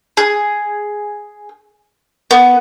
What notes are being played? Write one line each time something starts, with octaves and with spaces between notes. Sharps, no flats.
G#4
B3